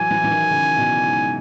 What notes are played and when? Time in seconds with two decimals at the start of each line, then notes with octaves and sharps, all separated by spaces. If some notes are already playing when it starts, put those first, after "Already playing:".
Already playing: E3 F#3 G#5
0.11 E3
0.24 E3
0.30 D#3
0.50 C#3
0.78 B2
1.05 G#2